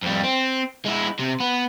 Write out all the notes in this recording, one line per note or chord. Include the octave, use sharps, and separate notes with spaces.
F2 G3
C4
G#3 E4
C3
B3